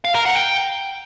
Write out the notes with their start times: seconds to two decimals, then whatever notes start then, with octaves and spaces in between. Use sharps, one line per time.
0.05 F5
0.15 A#4
0.25 F#5
0.36 G5